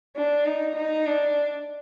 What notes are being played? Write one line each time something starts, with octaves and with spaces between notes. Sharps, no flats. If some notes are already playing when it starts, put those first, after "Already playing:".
D4
D#4
D#4
D4